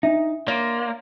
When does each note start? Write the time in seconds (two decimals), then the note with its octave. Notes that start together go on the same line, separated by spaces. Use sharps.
0.03 D4 D#4 E5
0.48 A#3 C#5 D5 C6